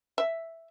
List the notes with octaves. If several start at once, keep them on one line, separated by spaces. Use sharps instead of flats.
E5